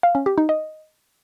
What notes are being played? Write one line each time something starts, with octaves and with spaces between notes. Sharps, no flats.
F5
C#4
G4
D#4
D#5